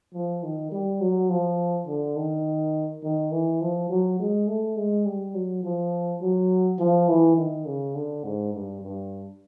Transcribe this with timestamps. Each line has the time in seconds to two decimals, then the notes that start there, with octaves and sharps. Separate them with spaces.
0.14 F3
0.43 D#3
0.72 G3
1.01 F#3
1.30 F3
1.88 D3
2.16 D#3
3.03 D#3
3.32 E3
3.61 F3
3.90 F#3
4.20 G#3
4.48 A3
4.76 G#3
5.06 G3
5.34 F#3
5.63 F3
6.21 F#3
6.79 F3
7.08 E3
7.37 D#3
7.66 C#3
7.95 D3
8.24 G#2
8.53 G2
8.82 G2